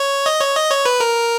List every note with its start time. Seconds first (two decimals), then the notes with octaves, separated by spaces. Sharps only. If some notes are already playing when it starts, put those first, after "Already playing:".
Already playing: C#5
0.26 D#5
0.40 C#5
0.56 D#5
0.70 C#5
0.85 B4
1.00 A#4